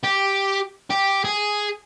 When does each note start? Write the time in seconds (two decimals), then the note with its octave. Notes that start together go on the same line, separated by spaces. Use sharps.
0.04 G4
0.90 G4
1.25 G#4